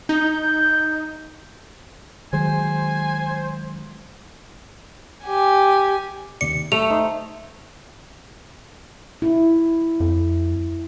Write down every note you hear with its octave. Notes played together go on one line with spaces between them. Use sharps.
D#4 G6
D#3 F#3 G#3 C5 G#5
G4 G#5
D#2 C3 D5 C#7
A3 F7
D#4 C5 C6
E4
F2